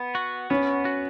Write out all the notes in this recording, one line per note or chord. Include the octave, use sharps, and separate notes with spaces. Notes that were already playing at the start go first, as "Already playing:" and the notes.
Already playing: B3
F#4
B3 C#4
F#4